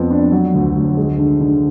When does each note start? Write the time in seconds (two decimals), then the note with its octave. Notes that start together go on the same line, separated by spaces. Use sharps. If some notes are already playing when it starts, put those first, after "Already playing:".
Already playing: F2 B3
0.11 D4
0.32 F#3
0.54 D2
0.75 D2
0.97 G#3
1.18 D3
1.40 D3